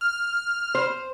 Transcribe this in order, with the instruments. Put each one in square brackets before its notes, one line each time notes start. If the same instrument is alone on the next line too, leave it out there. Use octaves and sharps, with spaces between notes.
[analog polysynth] F6
[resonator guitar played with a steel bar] C5